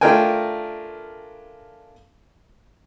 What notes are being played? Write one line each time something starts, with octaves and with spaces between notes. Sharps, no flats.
A3 D4 F4 A#4 G5 G#5